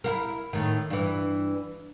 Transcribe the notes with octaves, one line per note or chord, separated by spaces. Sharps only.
E4 F4 A#4
A2 D#3
G2 E3